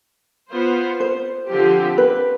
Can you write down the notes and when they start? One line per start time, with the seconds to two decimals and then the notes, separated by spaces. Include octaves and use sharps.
0.51 B3 F4 C5
1.00 C5
1.49 D3 F3 C4 G4
1.98 B4